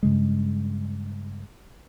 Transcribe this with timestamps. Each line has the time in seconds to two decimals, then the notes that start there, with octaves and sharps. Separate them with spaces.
0.03 G2 C#3 G#3